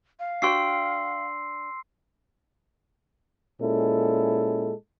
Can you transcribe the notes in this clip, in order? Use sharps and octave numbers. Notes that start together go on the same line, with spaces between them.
F5
D4 F#4 G5 C6 E6 C7
A#2 G#3 C#4 E4 A4